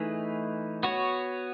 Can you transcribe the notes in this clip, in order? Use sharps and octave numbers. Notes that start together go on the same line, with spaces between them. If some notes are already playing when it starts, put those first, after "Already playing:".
Already playing: E3 A3 D#4 G#4 B4
B3 F#4 C#5